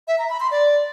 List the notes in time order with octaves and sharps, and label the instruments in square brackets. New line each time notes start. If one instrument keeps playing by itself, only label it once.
[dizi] E5
A#5
B5
C6
D5